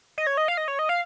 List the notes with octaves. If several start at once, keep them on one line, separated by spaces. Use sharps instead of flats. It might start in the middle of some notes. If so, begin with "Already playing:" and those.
D#5
C#5
D#5
F5
D#5
C#5
D#5
F5